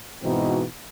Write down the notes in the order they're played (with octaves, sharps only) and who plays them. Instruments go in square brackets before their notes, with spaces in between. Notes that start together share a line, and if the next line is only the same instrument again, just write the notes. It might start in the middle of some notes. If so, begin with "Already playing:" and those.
[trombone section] G#2 B2 E3 C4 D#4 F#4